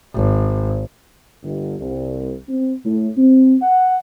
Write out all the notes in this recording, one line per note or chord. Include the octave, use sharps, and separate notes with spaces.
G#1
G1
C2
C4
A2
C4
F#5